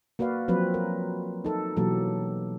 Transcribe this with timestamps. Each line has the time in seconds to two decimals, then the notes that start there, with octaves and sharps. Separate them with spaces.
0.19 A#3 F#4 B4 D5 F5
0.48 F3 F#3 C4 B4
0.74 A#4
1.44 D#4 A4 A#4
1.77 B2 E3 F#3 A#3 G4 A4